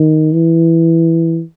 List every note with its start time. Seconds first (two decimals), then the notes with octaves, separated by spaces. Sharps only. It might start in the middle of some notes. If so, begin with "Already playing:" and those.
Already playing: D#3
0.33 E3